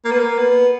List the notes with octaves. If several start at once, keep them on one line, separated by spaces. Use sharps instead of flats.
A#3
B3
A#3
B3